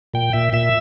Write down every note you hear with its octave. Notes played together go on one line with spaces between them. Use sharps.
A#2 G5
A#2 E5
A#2 E5